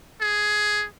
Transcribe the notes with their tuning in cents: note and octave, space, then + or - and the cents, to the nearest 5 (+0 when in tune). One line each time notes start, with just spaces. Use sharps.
G#4 +10